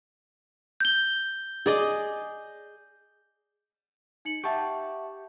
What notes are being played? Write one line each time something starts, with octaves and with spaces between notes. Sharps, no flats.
G6 G7
G#4 D5 D#5
D#4 C#7 F#7
G4 E5 F#5 A5 C#6